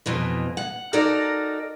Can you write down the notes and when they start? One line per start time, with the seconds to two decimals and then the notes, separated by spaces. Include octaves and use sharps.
0.06 F2 B2 E3
0.57 F#5
0.93 D#4 F#4 A4 A#4 D5